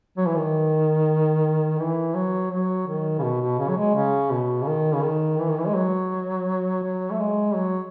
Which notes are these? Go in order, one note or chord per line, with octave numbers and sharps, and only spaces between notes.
F#3
E3
D#3
E3
F#3
F#3
D#3
C#3
B2
B2
C#3
F#3
G#3
C#3
B2
C#3
D#3
C#3
D#3
E3
D#3
E3
G#3
F#3
F#3
A3
G#3
F#3